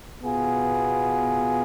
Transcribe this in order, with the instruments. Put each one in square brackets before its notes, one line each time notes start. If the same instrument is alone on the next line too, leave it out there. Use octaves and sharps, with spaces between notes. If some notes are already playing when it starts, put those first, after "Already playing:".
[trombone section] B2 B3 F4 G#4